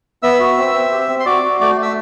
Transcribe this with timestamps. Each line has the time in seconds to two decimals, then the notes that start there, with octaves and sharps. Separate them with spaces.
0.23 B3 E5 E6
0.40 F#4
0.57 C4
0.75 C4
0.92 G4
1.09 C4
1.20 C6
1.26 F#4 D5 D6
1.43 F#4
1.61 A3 D5 D6
1.77 A3
1.82 E5 E6